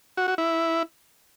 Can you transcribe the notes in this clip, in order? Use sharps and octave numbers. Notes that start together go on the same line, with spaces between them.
F#4
F#4
E4